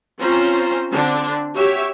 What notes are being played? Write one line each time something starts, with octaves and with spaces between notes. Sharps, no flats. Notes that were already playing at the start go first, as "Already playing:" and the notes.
C4 C#4 F4 C5 A#5
D3 C4 D4
F#4 G4 C#5 E5